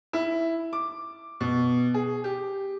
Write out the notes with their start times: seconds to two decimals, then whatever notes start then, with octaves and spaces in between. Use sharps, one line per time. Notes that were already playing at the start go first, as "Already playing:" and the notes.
0.13 E4
0.73 D6
1.41 B2
1.94 G#4
2.24 G4